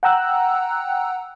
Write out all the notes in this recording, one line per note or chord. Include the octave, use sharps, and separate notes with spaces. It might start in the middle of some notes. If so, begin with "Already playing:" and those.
F#5 G5 A#5 E6 F#6